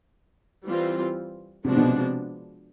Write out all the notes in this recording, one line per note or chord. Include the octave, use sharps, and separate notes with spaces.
E3 G3 C4 F4
C3 F3 G#3 B3 D4 F#4
B2
C3